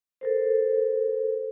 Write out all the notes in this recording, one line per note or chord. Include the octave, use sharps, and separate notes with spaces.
A4 A#4 C5